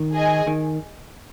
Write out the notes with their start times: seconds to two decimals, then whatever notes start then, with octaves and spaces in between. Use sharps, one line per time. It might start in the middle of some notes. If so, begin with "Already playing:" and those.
Already playing: D#3
0.13 G#4 D#5 G#5
0.47 D#3